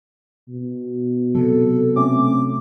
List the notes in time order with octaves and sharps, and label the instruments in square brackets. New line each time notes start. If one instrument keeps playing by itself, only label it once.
[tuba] B2
[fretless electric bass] C3 F#3 [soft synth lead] A4
[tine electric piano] A3 C4 C#4 [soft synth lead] D6